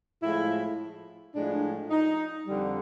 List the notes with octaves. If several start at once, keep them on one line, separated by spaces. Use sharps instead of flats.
A2 F3 G#3 E4
A2 F3 G#3 D4
D#4
F2 D3 G3